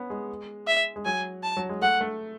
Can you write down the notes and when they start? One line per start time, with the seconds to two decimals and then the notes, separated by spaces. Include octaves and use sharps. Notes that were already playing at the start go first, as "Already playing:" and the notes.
Already playing: B3 C#4
0.10 G#3
0.67 E5
0.96 G#3
1.05 F#3 G#5
1.43 A5
1.57 F#3
1.69 G#3
1.81 A3 F#5
2.01 A3